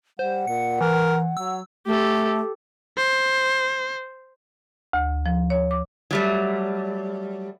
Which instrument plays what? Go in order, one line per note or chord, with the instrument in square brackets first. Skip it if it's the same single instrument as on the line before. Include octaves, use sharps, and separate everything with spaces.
[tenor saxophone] G3 [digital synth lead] C5 [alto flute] F#5
[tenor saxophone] A#2 [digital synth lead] C#7
[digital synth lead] E3 [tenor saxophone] A#4
[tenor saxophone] F#3 [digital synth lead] E6
[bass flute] A3 [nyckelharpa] G4 A4
[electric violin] C5
[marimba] D2
F3
C#5
D6
[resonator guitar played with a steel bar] F#3 G3 A3